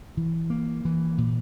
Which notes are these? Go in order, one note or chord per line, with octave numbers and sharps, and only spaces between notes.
E3
A#3
E3
A#2